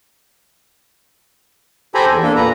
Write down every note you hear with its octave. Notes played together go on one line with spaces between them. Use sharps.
G4 A4 C5 G#5 A#5 B5
E2
A#3 D4 A4
A#2 B4 A#5